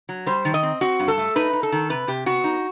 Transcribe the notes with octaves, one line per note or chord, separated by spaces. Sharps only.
F#3
G3 C5
D#3
D#5
C4
C4 F#4
G2
A4
A3
D#4 B4
D#4
A4
D#3
C3 B4
C3 G4
B3 F#4
D#4